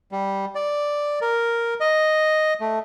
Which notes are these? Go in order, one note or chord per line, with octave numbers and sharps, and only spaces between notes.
G3
D5
A#4
D#5
A3